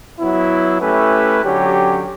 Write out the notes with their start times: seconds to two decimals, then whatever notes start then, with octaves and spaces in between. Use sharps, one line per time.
0.19 F#3 B3 E4
0.80 A3 C#4 E4 G4 B4
1.43 D3 F#3 C#4 G4